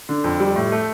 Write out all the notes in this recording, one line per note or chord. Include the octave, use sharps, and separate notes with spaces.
D3
F2
G3
A2
A3